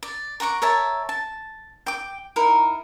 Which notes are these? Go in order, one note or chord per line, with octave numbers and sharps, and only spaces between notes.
D5
A#4 F#5 C#6 D6
A#4 C#5 E5 A5
A5
G5 D6
D#4 E4 A#4